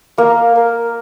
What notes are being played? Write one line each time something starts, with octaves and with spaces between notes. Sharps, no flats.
A#3 A#4
A#4